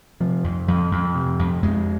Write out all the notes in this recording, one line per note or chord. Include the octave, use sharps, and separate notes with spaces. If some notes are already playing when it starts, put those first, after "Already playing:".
C3 F3
F2
F2
F2
C3
F2
F2 G#3